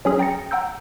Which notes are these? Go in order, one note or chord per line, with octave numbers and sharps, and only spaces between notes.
F#3 C#4 G#4
G5 A#5 A6 A#6 C#7
F#5 G5 A#5 E6 G6